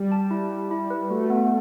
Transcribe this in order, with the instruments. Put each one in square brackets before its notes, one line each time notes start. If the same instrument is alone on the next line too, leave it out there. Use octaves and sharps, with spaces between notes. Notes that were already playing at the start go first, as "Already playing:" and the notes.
Already playing: [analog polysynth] G3
[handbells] A5
E4
E4
E4
B4
[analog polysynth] A3 [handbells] F#4
[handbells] B3